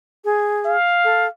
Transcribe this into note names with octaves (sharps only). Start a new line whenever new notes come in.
G#4
F5
A4